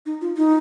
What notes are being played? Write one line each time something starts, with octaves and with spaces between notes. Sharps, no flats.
D#4
F4
D#4